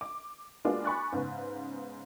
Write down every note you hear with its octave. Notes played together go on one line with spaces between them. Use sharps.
D6
G#3 A#3 B3 D4 F4 F#4
G#5 B5 C#6 D6 F#6 A6
G#2 C#3 B3